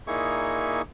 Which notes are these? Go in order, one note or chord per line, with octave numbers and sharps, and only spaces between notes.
A#2 A#3 D#4 E4 G#4 C#6